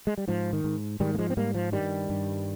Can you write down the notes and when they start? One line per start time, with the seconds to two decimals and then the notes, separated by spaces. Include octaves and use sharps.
0.07 G#3
0.18 G3
0.28 G#2 F3
0.53 D#3
0.64 G#2
1.00 G#2 D#3 G3
1.15 A#3
1.19 F3 G#3
1.30 C4
1.37 G#2 G3 A#3
1.55 F3
1.72 G2 D#3 G3
2.10 G2